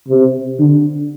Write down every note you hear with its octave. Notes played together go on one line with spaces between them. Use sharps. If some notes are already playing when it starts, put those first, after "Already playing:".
C3
D3